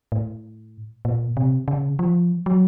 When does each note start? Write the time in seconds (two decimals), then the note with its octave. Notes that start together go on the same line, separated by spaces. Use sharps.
0.12 A2
1.05 A#2
1.37 C3
1.68 C#3
1.99 F3
2.46 F#3